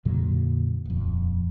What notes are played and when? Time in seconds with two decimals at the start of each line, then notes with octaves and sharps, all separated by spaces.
0.05 F2 A#2 D3 F#3
0.85 D#1 F2